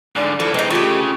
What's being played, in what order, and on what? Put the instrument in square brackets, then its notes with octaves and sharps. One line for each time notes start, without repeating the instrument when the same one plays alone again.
[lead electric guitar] G#2 D3 [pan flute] D5
[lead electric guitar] E3 F3 [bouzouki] A4
[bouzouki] E3 D#4 [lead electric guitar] G#3 C4 [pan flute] D#5
[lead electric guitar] C#3 [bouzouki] A3 G4 [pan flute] F4